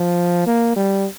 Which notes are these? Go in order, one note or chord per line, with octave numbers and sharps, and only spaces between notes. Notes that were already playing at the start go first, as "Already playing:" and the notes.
Already playing: F3
A#3
G3